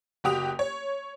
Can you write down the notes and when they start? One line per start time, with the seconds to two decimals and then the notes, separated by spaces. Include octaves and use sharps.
0.24 F#1 F#4 G4 D#6 F7
0.59 C#5